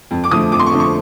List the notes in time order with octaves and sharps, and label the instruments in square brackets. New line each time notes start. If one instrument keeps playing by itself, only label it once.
[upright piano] F2
D6
D3 F3 A3 D#6
F2 D6
C6
C#6
D3 F3 A3
C#6